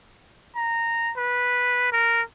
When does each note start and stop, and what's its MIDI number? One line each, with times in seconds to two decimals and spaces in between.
0.56 1.12 82
1.17 1.92 71
1.92 2.22 70